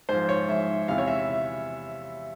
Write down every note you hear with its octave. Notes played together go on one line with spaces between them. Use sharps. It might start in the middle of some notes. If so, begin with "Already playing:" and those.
G#2 F3 C5
C#5
G#2 F3 E5
E2 C3 E3 F5
C#5
E5